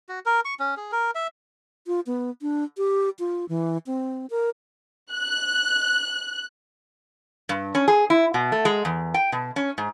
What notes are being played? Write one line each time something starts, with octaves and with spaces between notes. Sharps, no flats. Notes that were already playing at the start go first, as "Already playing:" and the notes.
F#4
A#4
C#6
C#4
G#4
A#4
E5
F4
B3
D4
G4
F4
E3
C4
A#4
F#6
G2
C#4
G#4
E4
B2
A3
G#3
E2
G5
B2
C#4
G#2